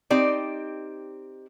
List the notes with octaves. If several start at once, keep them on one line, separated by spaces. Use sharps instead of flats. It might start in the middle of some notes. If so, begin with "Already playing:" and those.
C4 D#4 G4 D5